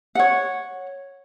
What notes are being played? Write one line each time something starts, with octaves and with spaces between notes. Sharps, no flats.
C#5 F#5